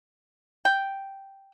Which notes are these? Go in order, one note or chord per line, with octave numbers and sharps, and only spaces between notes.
G5